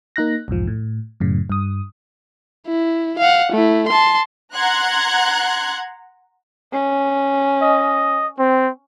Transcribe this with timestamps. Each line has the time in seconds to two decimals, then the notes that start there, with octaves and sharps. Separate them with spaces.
0.16 A#3 D#4 F#6 A#6
0.48 B1 E2 G#2 F3
0.67 A2
1.20 F#2 A2 C#3
1.50 G2 D#6
2.67 E4
3.19 F5 F#5
3.52 A3 E4
3.88 A5 C6
4.55 F#5 A#5 C6 F#6 G#6
6.72 C#4
7.61 D#5
8.37 C4